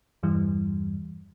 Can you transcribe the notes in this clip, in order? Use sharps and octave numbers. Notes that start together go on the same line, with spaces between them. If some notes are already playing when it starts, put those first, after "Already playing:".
E2 G2 E3 G3